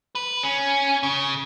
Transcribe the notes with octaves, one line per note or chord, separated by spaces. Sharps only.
B4
C#4
C#3